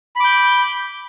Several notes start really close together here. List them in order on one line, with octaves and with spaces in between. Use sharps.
B5 D6 G6